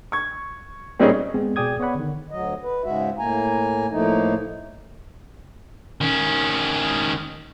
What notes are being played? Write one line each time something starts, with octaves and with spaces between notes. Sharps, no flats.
C#6 G#6
A#2 G3 C4 C#4 D#4 G#4
G#3 B3 C4 G#4
B2 G#4 D5 G5 D#6 G#6
B3 C#5 D5 F#5 B5
D3 D#3
D2 F#3 D#5
B4
G#2 C#3 G#3 F#4 E5
A2 A#3 G#5 A#5
A2 F3 A3 A#3 D#4
D#3 C#4